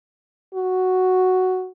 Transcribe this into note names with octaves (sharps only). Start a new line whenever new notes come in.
F#4